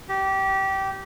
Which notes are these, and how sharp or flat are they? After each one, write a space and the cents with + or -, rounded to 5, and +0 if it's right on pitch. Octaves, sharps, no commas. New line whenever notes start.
G4 -20